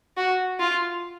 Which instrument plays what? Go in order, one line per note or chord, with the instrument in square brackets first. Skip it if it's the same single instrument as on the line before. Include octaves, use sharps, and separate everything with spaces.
[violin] F#4
F4